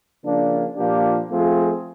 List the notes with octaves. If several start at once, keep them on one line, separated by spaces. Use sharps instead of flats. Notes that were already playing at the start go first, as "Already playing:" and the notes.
C#3 F3 A#3 D4
A#2 F3 A#3 D4 G4
F3 A3 C4 F4 G#4